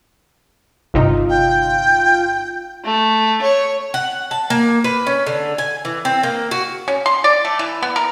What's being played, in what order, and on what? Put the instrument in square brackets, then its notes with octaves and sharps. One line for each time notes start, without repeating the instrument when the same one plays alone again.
[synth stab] G1 C3 D#4 [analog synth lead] F4
[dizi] G5
[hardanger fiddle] A3
C#5
[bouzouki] F#5
A5
A#3
B4
C#4
D3
G#5
E3
C4
A#3
F#4
[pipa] C#4
C6
D5
A3
E3
B3
A#4